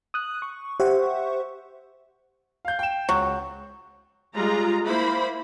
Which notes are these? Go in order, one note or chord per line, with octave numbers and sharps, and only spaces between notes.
D#6 F#6
C#6
G4 C5 E5 F#5 C#6
F5 G6
G5 E7
C#2 F#3
G3 G#3 F4 A#5
A#3 E4 C5 B5